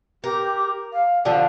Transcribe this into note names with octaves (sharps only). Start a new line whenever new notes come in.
G4 A#4
F5
D3 F3 A5